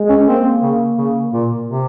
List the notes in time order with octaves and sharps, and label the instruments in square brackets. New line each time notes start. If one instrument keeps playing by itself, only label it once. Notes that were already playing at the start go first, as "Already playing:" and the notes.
Already playing: [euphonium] G#3
[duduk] C#4
[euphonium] A#3 [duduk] C4
[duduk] C#3
C#3
A#2
C3